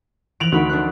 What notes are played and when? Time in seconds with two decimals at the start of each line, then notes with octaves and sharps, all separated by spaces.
0.40 E3 F3 D7 F7 F#7
0.52 D2 D#3 F#4 B5
0.69 D4 F#6